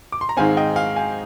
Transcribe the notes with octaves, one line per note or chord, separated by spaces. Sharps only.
D6
C6
A#5
G#2 D#3 G#3 C4 F5 G#5
D#5 G5
F5 G#5
F5 G#5